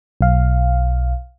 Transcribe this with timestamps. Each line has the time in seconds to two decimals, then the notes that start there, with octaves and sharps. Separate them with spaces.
0.21 B1 F5